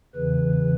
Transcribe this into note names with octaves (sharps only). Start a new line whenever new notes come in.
E2 C#3 E3 B4